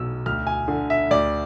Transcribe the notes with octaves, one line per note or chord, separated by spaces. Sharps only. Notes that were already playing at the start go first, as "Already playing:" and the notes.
Already playing: B1 B2 E6
D2 F6
G#5
D3
E5
D2 D5